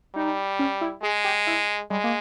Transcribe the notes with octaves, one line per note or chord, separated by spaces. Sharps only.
G3 D#4
C#4
E4
G#3 G#4
G4
E4
G3 G#3
A#3